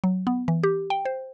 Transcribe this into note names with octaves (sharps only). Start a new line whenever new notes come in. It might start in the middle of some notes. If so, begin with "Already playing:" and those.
F#3
B3
E3
G4
G5
C5